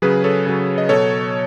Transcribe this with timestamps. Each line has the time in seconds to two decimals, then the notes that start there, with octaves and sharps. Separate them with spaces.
0.02 C#3 F#3 G#4 B4
0.24 A4 C#5
0.46 C#3 F#3
0.78 D#5
0.89 B2 F#3 A4 C#5